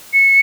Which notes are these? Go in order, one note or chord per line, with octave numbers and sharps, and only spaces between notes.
C#7